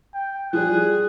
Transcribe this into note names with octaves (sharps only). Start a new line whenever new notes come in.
G5
F3 G3 G#4 F#6